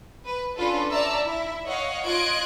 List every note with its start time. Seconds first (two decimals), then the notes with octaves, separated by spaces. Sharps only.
0.24 B4
0.56 C#4 D4 F4 A4 B4
0.91 C#5 D5 E5 A5 A#5 E6
1.23 E4 E5
1.65 C#5 D#5 F5 F#5
2.04 F4 D#5 F#6 G#6 D7